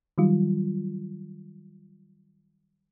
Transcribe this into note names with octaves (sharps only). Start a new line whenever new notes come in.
D#3 F#3 G3 F4